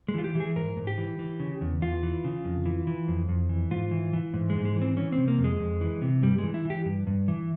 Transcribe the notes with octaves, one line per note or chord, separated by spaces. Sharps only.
G#3
E3 F4
G4
E3 G#4
G#2 A#4
G#2
G4
E3
E3
C#3
E2
E2 F4
E3
C#3
F2
E3
E3
F2
F2
E3
G#2 F4
E3
E3
G#2
G#3
G#2
G#3
E3
C4
E3 C#4
C4
C3
A#3
F2
G#3
F2
E3
C3
G2 G3
G#3
E3
E4
E3
G4
G2
G2
E3